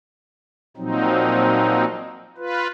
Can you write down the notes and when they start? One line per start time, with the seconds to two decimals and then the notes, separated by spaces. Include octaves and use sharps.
0.77 A#2 F3 F#3 C4 D#4
2.38 F4 B4